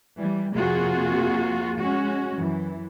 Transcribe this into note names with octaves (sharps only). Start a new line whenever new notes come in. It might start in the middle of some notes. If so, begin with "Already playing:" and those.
E3 G3
F2 C3 A#3 F4 F#4 G#4
G#3 C#4 F#4
F#2 E3